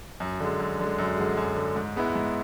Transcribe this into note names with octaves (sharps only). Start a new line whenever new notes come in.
F#2
D3 G#3
F#2
D3 G#3
F#2
D3 G#3
F#2
D3 G#3
G#2
G#3 B3 E4
G#2